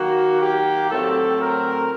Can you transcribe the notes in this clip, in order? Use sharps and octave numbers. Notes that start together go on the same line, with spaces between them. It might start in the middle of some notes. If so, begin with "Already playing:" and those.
Already playing: D#3 F#3 A#3 F#4
G4
A2 F#3 A3 C4 A4
A#4